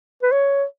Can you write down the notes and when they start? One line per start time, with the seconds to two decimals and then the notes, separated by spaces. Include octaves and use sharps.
0.23 B4
0.32 C#5